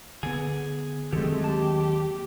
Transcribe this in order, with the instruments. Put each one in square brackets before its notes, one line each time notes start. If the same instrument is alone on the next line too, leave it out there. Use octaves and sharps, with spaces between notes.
[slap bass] D3 B3 [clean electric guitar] G#4
[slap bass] D#3 F#3 C4 [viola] G#3 A3 [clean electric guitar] G4 A4
[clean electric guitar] D#2 A5 [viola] G4